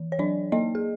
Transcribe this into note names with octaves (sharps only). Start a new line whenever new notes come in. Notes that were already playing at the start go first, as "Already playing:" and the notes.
Already playing: E3
C#5
F#3 D4 D5
A#3 D#4 D#5
G#4